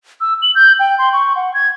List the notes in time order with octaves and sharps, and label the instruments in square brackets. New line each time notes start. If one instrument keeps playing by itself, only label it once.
[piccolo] E6
F#7
G6
G5
C6
C#6
F#5
G#6